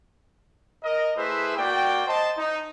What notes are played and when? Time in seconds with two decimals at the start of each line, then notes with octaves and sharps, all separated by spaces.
0.83 A#4 D#5
1.16 A3 E4 G#4 B4 C5 E5
1.57 A#3 F#4 D5 G5
2.07 C5 D#5 A5
2.37 D#4